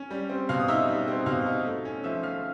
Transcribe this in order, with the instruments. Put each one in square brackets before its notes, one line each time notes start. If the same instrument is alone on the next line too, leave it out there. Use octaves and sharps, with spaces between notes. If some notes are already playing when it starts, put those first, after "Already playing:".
Already playing: [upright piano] C#4
G3
C4
B2 F5 F6
D#6
D#4 E5 E6
G3
C4
B2 F5 F6
D#4
A3
C#4
F3 E5 E6
F3 F5 F6